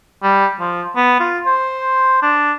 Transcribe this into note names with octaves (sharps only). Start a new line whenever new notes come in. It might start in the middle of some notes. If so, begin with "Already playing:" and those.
G3
F3
B3
F4
C5
D4